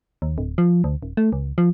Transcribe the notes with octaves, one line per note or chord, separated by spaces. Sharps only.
D#2
D1
F3
D2
D#1
A3
C#2
F3